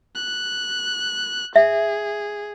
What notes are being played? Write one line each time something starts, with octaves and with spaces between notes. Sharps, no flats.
F#6
G#4 E5